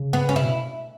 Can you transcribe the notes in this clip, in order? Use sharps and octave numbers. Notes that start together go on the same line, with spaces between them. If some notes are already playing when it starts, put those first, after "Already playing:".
Already playing: C#3
B3
C#4
E4
B2